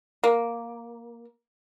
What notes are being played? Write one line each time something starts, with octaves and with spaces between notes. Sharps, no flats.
A#3